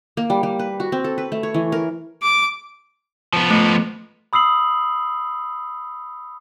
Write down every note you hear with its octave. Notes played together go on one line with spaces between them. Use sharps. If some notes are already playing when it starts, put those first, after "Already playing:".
A#3
G3
G3
B4
F#4
C4
A4
B4
A3
C#5
E3
A#4
D6
F3 B3
A3
B5 D#6 E6 C7 F#7